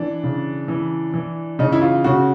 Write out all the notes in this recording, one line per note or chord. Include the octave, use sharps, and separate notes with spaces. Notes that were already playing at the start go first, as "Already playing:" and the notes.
Already playing: E3 D4
C#3
E3
E3
C#3 D#4
E4
F4
C#3 F#4